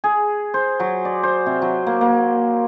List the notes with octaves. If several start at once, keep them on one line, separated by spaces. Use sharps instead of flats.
G#4
C5
F#3
D5
C5
C3
F#3
A#3
A#3